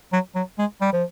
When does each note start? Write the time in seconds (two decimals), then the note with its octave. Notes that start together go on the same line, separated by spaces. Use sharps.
0.13 F#3
0.35 F#3
0.59 G#3
0.81 G3
0.93 F3